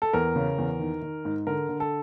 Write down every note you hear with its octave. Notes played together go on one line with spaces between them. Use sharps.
A4
E2 A#4
C#3
E2
D#3
D#3
G#2
D3 A#4
D3
A4